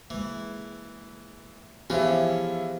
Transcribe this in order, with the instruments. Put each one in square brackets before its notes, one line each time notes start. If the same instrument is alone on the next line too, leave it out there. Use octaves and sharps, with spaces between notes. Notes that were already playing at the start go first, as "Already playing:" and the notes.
[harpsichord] E3 [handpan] G#3 A#3
[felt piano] E3 E5 [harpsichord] F3 C#4 [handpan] B3 G4 G#4